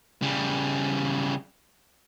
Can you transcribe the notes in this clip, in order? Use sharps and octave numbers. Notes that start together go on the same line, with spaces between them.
C#3 G3